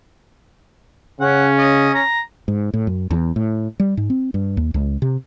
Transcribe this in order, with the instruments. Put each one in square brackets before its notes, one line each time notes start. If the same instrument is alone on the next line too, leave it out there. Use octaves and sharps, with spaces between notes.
[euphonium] C#3 [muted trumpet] C#4 [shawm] F#5
[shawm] D#5
A#5
[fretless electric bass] G#2
A2
F#2
E2
A2
G3
G#2
C4
G2
D#2
C#2
C3